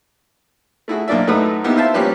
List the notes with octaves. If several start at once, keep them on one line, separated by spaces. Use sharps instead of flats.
A3 E4 F#4 G#4
B1 A#3 D4 D5 E5
F#2 A2 A3 D#4 B4 D#6
A#3 B3 D#4 E4 G4
E4 F4 C5 E5 A5
F3 G3 A#3 C#4 G4 B4